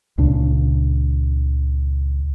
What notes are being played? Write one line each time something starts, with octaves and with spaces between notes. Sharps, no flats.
C#2 A#2 C#3 D4